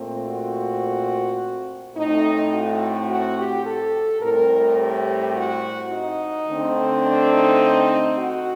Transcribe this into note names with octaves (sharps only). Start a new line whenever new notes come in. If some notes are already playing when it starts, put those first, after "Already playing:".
Already playing: A#2 A3 C4
F#4
A2 A3 C4 D#4
F#4
F#4
G4
A4
A2 G3 C4 A#4
G4
F#4
D#4
D3 A3 C4
D4
D#4
F#4